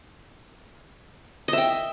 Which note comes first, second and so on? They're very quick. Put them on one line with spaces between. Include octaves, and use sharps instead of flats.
D#5 E5 G5